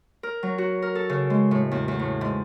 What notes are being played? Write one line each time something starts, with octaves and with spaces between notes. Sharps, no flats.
A#4
F#3
F#4
A#4
A4
C#3
G#3
A2
E2
E2
A2
G#2